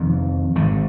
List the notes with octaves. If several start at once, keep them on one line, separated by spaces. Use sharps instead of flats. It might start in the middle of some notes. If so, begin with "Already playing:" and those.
Already playing: F1 F2 D#3
G#1 G#2 D#3